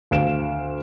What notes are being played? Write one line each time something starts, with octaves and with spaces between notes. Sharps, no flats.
D2 F5 D7 E7